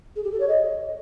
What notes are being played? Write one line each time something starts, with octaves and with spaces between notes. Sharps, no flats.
G#4
G4
A4
C#5
D#5